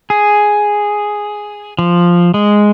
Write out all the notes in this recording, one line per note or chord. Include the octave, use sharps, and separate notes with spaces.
G#4
F3
G#3